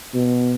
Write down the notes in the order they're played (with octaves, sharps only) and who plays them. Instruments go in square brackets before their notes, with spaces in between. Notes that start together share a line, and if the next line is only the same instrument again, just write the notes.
[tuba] B2